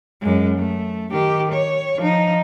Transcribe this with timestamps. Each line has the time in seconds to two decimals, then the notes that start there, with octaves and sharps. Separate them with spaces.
0.21 F#2 G#3
0.58 A3
1.11 D#3 G4
1.52 C#5
1.98 F3 D#4